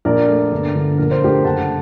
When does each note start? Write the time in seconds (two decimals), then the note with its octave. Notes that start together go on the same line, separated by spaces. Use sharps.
0.05 A#1 A#4 D5
0.28 A3
0.52 G1
0.75 D3
0.98 A#1 A#4
1.11 C5
1.22 A3 G4 A#4
1.44 F#1 F#5 A5